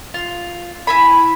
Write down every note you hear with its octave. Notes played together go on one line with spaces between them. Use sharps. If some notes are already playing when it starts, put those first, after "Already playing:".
F4
E4 G#5 B5